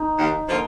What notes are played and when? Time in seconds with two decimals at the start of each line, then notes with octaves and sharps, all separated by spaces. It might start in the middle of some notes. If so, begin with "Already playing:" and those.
Already playing: D#4
0.18 D#2
0.47 D3 F3 A#3 F4